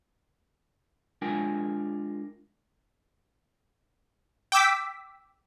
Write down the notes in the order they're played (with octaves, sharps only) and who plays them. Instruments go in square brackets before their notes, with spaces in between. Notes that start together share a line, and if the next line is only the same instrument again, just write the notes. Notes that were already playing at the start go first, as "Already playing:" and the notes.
[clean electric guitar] G#3 D4 F4 A#4 G5 G#5
[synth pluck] G5 D6 E6 B6